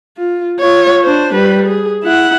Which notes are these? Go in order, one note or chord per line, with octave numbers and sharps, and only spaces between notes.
F4
F4 C#5
D4 C5
G3 B4
G#4
E4 F#5